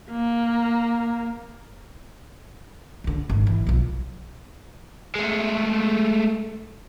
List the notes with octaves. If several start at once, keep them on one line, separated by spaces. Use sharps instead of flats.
A#3
D2 D3
G#1
E3
B1 F3
G#3 A3